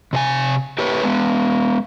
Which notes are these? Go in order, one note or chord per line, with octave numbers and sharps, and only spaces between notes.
C3 C5 G#5
G4 B4 C#5
G#3 B3